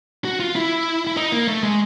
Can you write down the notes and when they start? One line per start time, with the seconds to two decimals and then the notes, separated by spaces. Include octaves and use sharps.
0.25 F#4
0.40 F4
0.55 E4
1.07 E4
1.17 D#4
1.32 A#3
1.48 A3
1.63 G#3